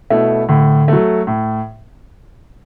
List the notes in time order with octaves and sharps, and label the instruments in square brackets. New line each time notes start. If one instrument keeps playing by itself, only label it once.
[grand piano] B2 A3 E4
[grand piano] A2 [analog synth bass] D3
[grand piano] F#3 A3
A2